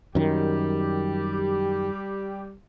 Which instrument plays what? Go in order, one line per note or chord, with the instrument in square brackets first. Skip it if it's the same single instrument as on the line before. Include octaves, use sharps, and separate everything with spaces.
[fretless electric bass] F#2 D#3 [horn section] G3 G4